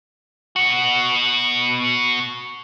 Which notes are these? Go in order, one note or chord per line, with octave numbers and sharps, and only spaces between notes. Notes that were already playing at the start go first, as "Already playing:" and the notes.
B2 F#4